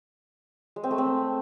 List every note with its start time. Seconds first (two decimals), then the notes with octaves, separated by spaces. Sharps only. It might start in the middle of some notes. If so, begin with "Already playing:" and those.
0.76 G#3
0.83 C4
0.91 A3
0.98 C4